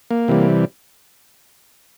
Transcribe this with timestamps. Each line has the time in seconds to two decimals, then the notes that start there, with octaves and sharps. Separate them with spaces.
0.11 A#3
0.28 C3 E3 G3